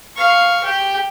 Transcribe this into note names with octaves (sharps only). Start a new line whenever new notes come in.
F5 C#6
G4